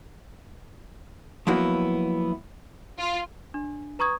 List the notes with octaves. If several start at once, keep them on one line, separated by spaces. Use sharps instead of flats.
F3 F#3 A#3 B3 E4 F#4
F4
D4
B4 A#5 C#6 D#6 G#6